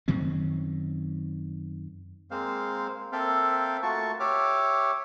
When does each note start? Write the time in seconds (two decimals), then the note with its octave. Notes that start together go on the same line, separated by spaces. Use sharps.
0.08 F#2 D#3 C4 C#4
2.31 G#3 A#3 C4 C5 F5
3.12 A#3 C4 A4 E5 F5 G5
3.82 A3 A#3 F4 F#4 A5 C#6
4.20 G4 C#5 E5 D6 F6